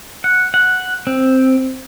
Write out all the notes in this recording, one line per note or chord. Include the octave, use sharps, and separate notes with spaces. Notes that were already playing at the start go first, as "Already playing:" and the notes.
F#5
F#5
C4